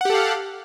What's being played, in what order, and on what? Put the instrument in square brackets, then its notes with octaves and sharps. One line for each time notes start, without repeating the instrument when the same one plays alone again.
[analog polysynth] F#5
G4
A4
F5